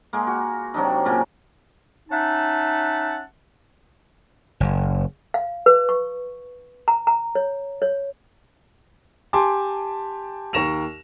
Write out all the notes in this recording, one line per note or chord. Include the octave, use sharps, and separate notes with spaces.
G#3 A#3
F#4
C3 F#3 D4 D#4
A#2 C#3 A#3
C#4 D#4 E5 F#5 A5
F#1
F5
B4
C#6
A#5
A#5
C#5
C#5
G4 G#5 A5 C6 D6
D#2 A#4 C#6 A#6 E7 F7